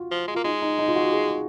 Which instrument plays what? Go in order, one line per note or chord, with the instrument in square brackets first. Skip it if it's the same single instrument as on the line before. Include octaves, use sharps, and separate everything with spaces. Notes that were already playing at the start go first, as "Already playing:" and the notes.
Already playing: [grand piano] F4 F#4
[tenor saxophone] F3
G#3
[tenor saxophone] A#3 [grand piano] F4
[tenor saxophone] G#3 [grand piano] D#4
[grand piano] D#4
D#4
F4
F#4
G#4